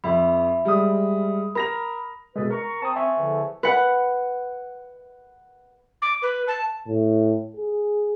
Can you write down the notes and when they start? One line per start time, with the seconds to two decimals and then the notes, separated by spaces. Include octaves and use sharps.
0.04 F2 E5 B5
0.65 G3 G#3 D#6
1.55 A#4 B5 A#6 F7
2.36 B2 G#3 G#4 A4 B4
2.50 A#4 A#5 C#6
2.82 C4 A5 D#6
2.96 E5 G#5 C#6
3.17 E2 D3 F3
3.63 B4 F#5
6.02 D6
6.22 B4
6.48 A5
6.88 A2
7.56 G#4